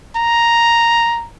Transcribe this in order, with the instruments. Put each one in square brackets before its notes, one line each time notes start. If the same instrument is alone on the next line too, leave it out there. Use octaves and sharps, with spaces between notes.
[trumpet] A#5